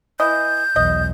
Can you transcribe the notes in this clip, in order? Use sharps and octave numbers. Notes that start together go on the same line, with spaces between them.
E3 D#5 G6
B1 E2 D#5